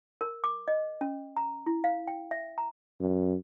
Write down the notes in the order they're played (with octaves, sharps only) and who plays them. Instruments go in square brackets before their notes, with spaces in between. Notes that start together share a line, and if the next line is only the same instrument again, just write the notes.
[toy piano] A#4
D6
D#5
C#4
A#5
E4
F5
G5
E5
A#5
[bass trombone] F#2